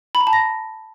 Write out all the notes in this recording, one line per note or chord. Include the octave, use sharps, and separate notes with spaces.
B5
A#5
A5
A#6